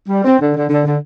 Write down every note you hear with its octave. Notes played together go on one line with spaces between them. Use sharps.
G3
C4
D3
D3
D3
D3